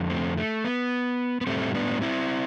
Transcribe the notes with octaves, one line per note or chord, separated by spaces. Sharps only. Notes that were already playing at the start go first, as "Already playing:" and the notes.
Already playing: F2 D3 F3
A3 C4
A3
B3
B3
A2 G3 A3 C4
B3 D4
C4 E4